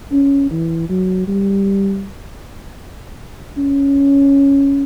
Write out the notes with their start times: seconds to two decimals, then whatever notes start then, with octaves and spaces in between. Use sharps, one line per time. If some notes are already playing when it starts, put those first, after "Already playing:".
0.12 C#4
0.51 E3
0.89 F#3
1.27 G3
3.57 C#4